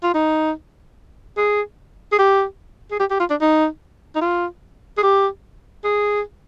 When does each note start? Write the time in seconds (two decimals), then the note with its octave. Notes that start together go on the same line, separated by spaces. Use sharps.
0.03 F4
0.14 D#4
1.37 G#4
2.12 G#4
2.19 G4
2.91 G#4
3.00 G4
3.10 G4
3.19 F4
3.30 D4
3.41 D#4
4.15 D#4
4.21 F4
4.98 G#4
5.03 G4
5.84 G#4